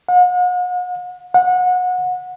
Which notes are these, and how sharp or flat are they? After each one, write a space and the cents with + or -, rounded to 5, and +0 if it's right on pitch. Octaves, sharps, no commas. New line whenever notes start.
F#5 -40
F#5 -25